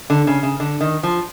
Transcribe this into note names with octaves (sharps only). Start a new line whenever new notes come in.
D3
C#3
C#3
D3
D#3
F3